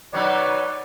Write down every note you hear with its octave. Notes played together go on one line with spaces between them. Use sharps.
B2 F#3 D#4 B4 C#5 D5